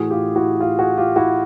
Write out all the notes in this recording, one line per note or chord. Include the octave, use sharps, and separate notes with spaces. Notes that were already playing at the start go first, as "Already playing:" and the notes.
Already playing: A2 E3 F#4 G#4
F4 G4
E4 F#4
F4 G4
F#4 G#4
F4 G4
E4 F#4